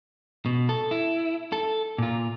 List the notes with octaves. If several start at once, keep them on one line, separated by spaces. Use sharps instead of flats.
B2
A4
E4
A4
A#2 F4